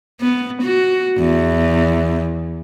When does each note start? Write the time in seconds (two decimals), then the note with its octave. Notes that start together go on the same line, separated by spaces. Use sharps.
0.21 B3
0.62 F#4
1.18 E2